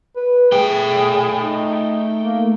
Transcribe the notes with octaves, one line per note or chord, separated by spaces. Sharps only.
B4
A3 G#4 G5
D#4
A#3